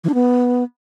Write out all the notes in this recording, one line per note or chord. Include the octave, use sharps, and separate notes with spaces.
E3
D4
B3